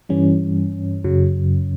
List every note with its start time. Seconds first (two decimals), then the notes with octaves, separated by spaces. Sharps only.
0.09 G2 E3 G3 C#4
1.04 F#2 C#3 F#3